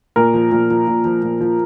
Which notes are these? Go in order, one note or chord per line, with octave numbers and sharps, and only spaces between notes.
A#2 A#4
F3
A#2
F3
A#2
F3
A#2
F3